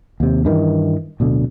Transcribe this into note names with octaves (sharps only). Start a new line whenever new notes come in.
D#2 C3
G2 D#3 E3
D1 B2 D3